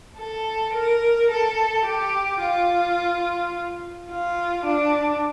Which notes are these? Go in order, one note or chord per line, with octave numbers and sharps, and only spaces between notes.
A4
A#4
A4
G4
F4
F4
D4